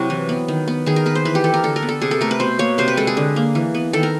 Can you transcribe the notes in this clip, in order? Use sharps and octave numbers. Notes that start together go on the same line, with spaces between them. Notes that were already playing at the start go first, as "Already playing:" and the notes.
Already playing: C3 F#3 E4 F#4
E3
B3
D#3
B3
D#3 G#4
A#4
B3 B4
C5
E3 B4
G4
E3 A4
A#4
D3 A4
A#4
B3
A4
C3 G#4
A4
A3 A#4
B4
B2 C5
A#3 C#5
C3 C5
B4
G#3 A4
G#4
D3
A#3
E3
B3
D#3 A4
A#4